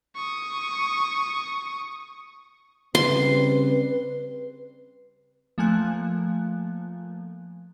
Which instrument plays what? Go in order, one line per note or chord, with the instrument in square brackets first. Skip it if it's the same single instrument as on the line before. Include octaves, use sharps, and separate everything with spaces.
[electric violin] C#6 D#6
[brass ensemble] C#3 G3 C4 [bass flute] B4 [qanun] C6
[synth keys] F3 A3 A#3 G#5 F#6